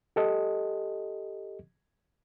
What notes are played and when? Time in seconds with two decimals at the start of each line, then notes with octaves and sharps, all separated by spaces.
0.16 G4 A4 D#5